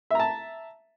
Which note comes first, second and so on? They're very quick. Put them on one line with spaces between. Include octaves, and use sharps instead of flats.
E5 A#5 A5